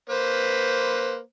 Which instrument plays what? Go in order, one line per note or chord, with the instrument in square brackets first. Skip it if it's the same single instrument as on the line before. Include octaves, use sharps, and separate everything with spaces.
[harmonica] A#3 B4 C5